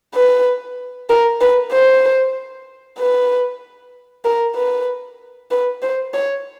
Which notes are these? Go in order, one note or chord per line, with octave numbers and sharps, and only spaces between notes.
B4
A#4
B4
C5
B4
A#4
B4
B4
C5
C#5